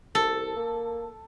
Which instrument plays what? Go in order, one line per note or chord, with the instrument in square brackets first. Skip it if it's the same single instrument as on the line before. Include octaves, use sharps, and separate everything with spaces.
[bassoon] C2 [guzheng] A4
[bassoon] A#3